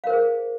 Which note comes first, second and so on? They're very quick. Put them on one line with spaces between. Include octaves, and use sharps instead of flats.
F5 A#4 C5 G#4